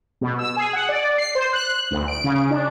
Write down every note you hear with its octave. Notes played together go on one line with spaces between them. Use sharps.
B2
E6
G#4
F#5
D5
C7
C5
F#6
D2
D7
C#3
D4